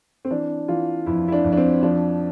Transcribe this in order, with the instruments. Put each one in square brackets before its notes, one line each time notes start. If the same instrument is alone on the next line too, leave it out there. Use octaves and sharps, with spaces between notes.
[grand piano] C4
E3 D4
E3 F4
F2 E4
E4
D4
F2
D4
C4
F3 D4